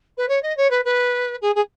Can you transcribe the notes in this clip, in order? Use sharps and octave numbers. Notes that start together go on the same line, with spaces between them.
B4
C#5
D#5
C#5
B4
B4
G#4
G#4